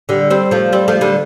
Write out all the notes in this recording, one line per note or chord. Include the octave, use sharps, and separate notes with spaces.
D3 G3
G3 C4
F3 A3
G3 C4
F3 A3
D3 G3